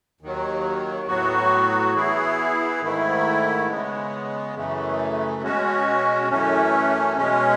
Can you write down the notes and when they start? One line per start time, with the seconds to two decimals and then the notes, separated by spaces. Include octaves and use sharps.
0.21 D#2 D#3 F#3
1.07 A2 F#3 B3 F#4
1.94 E3 B3 E4 G#4
2.81 G#2 D#3 A3 E4
3.68 C#3 G#3 B3
4.55 F#2 C#3 E3 A3
5.42 B2 G#3 C#4 F#4
6.29 F#2 E3 A3 C#4
7.16 B2 G#3 C#4